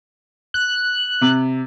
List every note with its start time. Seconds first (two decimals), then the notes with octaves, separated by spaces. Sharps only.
0.54 F#6
1.21 C3